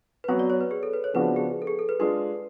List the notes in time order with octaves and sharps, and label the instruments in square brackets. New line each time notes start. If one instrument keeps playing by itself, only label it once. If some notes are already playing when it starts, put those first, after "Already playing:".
[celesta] B4
[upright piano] F#3 B3 F#4 [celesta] C#5
[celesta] D5
C#5
B4
G#4
A4
B4
C#5
[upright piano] C#3 F3 B3 D4 F#4 [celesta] B4
[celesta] G#4
A4
G#4
A4
B4
[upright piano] G#3 D4 F4 G#4 [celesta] B4